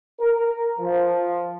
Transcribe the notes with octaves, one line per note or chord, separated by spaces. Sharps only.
A#4
F3